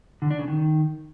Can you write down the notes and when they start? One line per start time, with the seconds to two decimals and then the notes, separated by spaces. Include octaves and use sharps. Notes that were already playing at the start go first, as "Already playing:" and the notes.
0.22 D3
0.31 D4
0.39 C#3
0.48 D#3